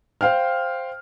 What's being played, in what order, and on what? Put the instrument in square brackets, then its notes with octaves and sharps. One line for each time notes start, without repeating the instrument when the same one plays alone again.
[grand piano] C5 F5 G5 F6